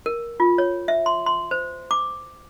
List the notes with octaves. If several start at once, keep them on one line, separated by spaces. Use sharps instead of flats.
A#4
F4
C#5
E5
C6
C6
C5
D6